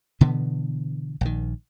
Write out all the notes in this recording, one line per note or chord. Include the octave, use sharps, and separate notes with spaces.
B2 D3 E3 B3
A#1 D#3